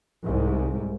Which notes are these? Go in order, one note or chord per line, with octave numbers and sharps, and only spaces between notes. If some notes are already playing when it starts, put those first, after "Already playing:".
C2 G#2